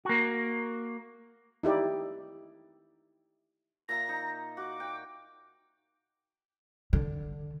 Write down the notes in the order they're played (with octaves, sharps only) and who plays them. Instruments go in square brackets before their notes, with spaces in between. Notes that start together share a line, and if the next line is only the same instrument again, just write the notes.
[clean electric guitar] A#3 F#4
[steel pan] D#4 E4 G4 D5
[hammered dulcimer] A#2 E5 A#5 [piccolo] A#6
[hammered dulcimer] D#4 A#5
[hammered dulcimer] F#4 [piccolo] D6
[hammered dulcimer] G5
[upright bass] D3